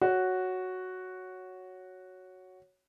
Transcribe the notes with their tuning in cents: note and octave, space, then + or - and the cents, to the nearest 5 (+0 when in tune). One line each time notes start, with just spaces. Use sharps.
F#4 +0 C#5 +0